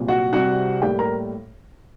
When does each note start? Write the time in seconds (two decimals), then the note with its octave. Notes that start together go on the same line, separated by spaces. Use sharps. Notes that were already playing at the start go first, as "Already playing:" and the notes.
Already playing: C2 A#2 F#3
0.08 F#4 F#5
0.33 C2 C3 G3 F#4 F#5
0.82 A2 G3 A#3 G4 G5
0.99 A#4 A#5